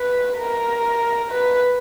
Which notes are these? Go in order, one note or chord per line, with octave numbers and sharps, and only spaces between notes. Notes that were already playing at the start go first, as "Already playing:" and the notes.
Already playing: B4
A#4
B4